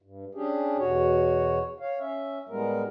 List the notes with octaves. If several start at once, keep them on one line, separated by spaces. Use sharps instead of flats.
G2
C#4 D4 G4 G#4
E2 B2 F#4 C#5
C#5 F5
C#4 E5
A2 G3 G#3 B3 A#4